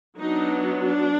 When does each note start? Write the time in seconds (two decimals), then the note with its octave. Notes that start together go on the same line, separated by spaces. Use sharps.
0.18 F#3 B3 D4 D#4
0.84 D4